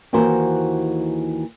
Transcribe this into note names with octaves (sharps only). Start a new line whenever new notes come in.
D#2 E3 F#4 A#4 C5